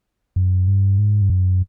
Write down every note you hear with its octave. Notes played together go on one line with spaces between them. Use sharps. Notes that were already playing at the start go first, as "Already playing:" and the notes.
F#2
G2
G#2
G2
F#2